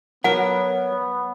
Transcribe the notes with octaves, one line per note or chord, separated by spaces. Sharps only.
F#3 B3 A#4 C#5 F#5